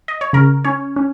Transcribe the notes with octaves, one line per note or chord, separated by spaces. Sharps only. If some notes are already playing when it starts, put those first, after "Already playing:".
D#5
C#5
C#3 A#4
C#4 C#5
C#4